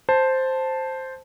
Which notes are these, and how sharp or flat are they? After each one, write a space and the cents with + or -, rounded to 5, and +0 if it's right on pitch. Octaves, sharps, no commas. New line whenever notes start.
C5 +0 A5 +0